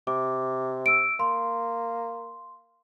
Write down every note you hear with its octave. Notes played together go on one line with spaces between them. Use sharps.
C3 D6
E6 D7
A#3 C6